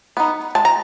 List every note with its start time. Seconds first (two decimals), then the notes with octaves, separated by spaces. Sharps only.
0.17 B3 D#4
0.55 G#3 A5
0.65 A#5